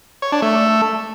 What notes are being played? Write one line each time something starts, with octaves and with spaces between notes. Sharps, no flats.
C#5
D4
A3